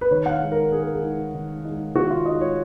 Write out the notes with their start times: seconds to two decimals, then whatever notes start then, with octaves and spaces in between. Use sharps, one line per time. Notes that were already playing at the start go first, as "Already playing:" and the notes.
0.01 B4
0.11 D#3 C#5
0.26 F#5
0.30 F5
0.41 G#3 D#4
0.52 A#4
0.72 D#3 G#4
0.83 A#4
0.95 G#4
1.03 G#3 D#4
1.34 D#3
1.65 G#3 D#4
1.95 D#3 F#4
2.11 F4
2.25 D#4 D#5
2.31 G#3
2.41 C#5